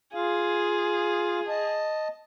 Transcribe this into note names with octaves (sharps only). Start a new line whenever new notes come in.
F4 G#4 F5
D#5 A5